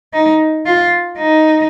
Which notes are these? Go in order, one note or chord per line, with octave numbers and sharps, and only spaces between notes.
D#4
F4
D#4